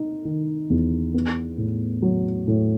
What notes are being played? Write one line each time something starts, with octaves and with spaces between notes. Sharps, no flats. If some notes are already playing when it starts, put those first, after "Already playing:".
Already playing: D#4
D#3
E2
B3
A2
F#3
A2